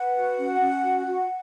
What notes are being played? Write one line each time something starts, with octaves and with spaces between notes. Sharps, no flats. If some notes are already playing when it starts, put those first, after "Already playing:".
Already playing: B4 F#5
F#4
C#4
C#4
F#4
F#4